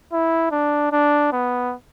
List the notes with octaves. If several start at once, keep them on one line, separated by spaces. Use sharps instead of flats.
E4
D4
D4
B3